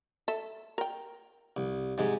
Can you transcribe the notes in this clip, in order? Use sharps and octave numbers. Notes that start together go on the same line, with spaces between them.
A4 E5
A#4 G5
C2
G#2 C3 G#3